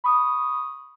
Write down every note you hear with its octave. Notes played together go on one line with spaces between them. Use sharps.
B5 C#6 D#6